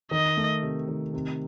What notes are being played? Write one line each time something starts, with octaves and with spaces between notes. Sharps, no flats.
D#3 D#5
A3
C3
D#3
C3